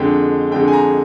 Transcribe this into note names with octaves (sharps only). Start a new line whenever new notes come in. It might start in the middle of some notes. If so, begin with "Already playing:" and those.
Already playing: F2 D3 G#3 G5
F2 D3 G#3 G5
G#5
A#5